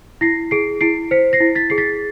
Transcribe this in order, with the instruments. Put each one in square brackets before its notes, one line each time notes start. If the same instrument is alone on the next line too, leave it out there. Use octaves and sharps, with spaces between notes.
[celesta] E4 A#6 C7
G#4 C7 D7
E4 C7 D7
C5 B6 C#7
A#6 C7
E4
A6 B6
G#4 C7
A6 B6